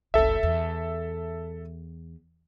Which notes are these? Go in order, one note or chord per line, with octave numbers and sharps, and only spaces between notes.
F#1 C2 A4 E5
E2